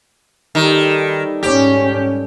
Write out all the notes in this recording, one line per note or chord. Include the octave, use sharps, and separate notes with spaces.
D#3 G3 A4 A#4
B4 A5
G#2 C#4 G4